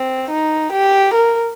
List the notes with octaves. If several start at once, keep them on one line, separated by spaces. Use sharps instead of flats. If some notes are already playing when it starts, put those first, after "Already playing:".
Already playing: C4
D#4
G4
A#4